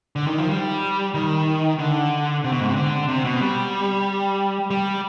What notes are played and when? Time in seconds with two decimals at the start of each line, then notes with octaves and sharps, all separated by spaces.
0.16 D3
0.27 D#3
0.38 F3
0.50 G3
1.14 D#3
1.79 D3
2.44 C3
2.52 B2
2.60 G#2
2.68 C3
2.76 D3
3.09 C3
3.25 B2
3.41 G3
4.70 G3